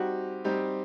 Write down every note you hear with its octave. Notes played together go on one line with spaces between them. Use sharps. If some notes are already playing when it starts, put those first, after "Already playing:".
Already playing: G3 C4 D#4 F#4 G4
G3 C4 D#4 G4